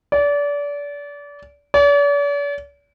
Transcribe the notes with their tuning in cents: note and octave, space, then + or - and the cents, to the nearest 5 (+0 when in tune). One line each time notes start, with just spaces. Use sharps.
D5 -30
D5 -45